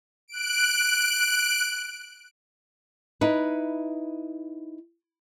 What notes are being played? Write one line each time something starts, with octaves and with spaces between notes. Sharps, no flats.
F#6 D7
D#4 E4 B4